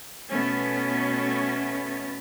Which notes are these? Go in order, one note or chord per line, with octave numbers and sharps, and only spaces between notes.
B2 A3 B3 C#4